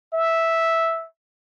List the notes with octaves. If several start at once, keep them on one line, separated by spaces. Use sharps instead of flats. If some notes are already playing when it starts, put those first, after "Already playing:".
E5